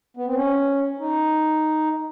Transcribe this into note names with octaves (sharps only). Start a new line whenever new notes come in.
B3
C4
C#4
D#4